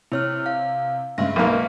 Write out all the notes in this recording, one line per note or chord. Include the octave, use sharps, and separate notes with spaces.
C3 E4 C#5 F6
F5
G2 C#3 G#3 E5 A#6
B1 A#3